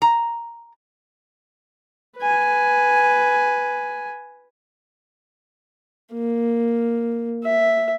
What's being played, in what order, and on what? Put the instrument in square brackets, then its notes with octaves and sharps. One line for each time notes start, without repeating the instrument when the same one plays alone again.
[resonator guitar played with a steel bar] A#5
[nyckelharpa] B4 G#5
A#3
E5